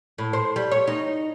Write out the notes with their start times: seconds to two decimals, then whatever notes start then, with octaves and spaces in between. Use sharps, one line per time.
0.18 A2
0.33 C5
0.56 G3
0.71 C#5
0.87 D#4